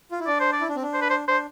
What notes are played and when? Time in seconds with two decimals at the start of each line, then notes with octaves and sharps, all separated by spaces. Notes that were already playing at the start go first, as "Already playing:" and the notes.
0.11 F4
0.20 E4
0.27 D4 D5
0.40 C5
0.53 D5
0.61 E4
0.69 D4
0.76 C4
0.82 D4
0.94 C5
1.02 B4
1.10 C5
1.28 D4 C5